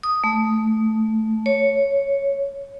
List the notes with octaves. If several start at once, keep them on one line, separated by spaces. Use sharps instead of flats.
D#6
A3
C#5